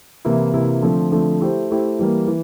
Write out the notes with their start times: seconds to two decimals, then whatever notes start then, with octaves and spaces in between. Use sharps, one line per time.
0.25 C3 E3 A#3 E4
0.53 C3 E3 A#3 E4
0.82 D3 F3 A3 C4
1.12 D3 F3 A3 C4
1.41 A3 E4 G4 C5
1.70 A3 E4 G4 C5
1.99 E3 G3 A#3
2.27 E3